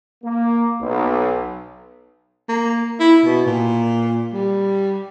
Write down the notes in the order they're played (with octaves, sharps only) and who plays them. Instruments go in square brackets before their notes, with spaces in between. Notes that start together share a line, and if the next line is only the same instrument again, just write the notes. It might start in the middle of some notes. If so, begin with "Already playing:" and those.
[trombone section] A#3
B1
[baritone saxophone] A#3
E4
B2
A#2
G3